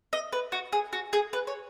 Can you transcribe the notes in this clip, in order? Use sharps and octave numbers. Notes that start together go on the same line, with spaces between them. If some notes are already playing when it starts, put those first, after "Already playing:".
D#5
B4
F#4
G#4
F#4
G#4
B4
C#5